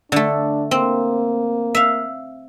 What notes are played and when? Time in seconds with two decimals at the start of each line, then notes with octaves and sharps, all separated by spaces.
0.12 D3 A3 D4
0.71 A#3 C4
1.75 E5 F5